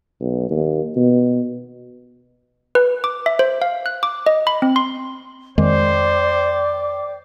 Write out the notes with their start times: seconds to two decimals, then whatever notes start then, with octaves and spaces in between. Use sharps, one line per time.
0.21 B1
0.51 D#2
0.97 B2
2.75 B4
3.04 D6
3.26 E5
3.39 C5
3.62 F5
3.86 F#6
4.03 D6
4.26 D#5
4.47 B5
4.62 C4
4.76 C6
5.58 F2 D#3 G#3 C5 D5 G5 D6